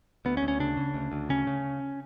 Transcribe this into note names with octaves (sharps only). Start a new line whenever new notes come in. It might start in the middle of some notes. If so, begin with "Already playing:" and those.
D2 B3
C#4
D2
C#4
C#3 D4
C#3
D2
D2
C#3 C#4
C#3